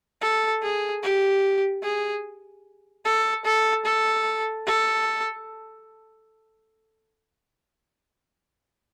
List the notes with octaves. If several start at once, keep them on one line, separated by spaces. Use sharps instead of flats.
A4
G#4
G4
G#4
A4
A4
A4
A4